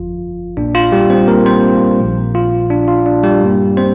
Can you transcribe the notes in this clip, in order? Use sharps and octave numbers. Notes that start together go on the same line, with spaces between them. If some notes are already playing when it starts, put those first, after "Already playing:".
Already playing: G1 F2 F3 F4
A#1 A#2 A#3 D4
F4
G3 G4
C4 C5
A#3 A#4
C4 C5
A#1 A#2 F3
F4
D4
F4
D4
G3 G4
G2 G3 A#3
C4 C5